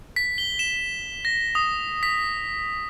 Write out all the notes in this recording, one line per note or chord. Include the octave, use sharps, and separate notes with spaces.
B6
G7
E7
A#6
D#6
B6